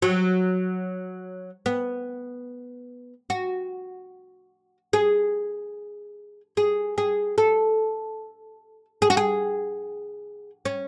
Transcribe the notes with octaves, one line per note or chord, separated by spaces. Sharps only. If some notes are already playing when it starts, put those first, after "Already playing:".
F#3
B3
F#4
G#4
G#4
G#4
A4
G#4
F#4
G#4
C#4